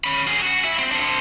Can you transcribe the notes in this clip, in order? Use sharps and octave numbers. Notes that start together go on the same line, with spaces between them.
C#4 B5
F#4 G#4
F#4
E4 E5
C4
D4 C5